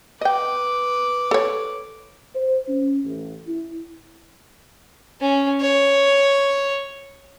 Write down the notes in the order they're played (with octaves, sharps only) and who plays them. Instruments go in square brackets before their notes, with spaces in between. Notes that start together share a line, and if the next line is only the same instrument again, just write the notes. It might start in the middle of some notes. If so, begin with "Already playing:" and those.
[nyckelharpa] B4 D6 [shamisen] D#5 G5
[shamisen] A4 C#5
[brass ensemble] C5
C#4
A1
E4
[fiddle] C#4
C#5